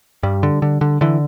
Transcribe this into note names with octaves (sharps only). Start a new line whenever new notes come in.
G2 G3
D3
D3
D3
D3 E3